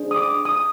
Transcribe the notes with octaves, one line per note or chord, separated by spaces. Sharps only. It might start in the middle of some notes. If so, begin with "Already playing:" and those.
Already playing: D4 G#4 C5
D#6
D6
D#6